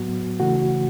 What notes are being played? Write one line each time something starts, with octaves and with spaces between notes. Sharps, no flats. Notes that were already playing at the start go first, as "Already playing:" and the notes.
Already playing: A2 F#3 B3 F#4
C#3 E3 A3 F#4